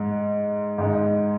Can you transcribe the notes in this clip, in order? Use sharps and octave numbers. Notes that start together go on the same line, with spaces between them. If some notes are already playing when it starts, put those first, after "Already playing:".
Already playing: G#2 G#3
G#2 G#3 D#4